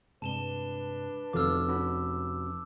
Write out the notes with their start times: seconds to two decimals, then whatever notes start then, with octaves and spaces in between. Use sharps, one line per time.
0.22 G2 C3 G#3 D4 B4 A5 E7 G7
1.33 F1 F4 F#4 A4 D6 E6 F6
1.68 C#4 F#4 B5